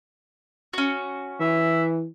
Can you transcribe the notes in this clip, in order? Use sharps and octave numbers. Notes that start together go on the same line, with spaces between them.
C#4 F#4
E3 E5